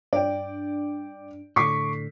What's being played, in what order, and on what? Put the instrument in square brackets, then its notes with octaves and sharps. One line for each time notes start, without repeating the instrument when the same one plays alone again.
[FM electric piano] G2 D4 [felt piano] D5 G5
[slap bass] A2 D3 [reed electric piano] C#6 [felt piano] D6 B6 C7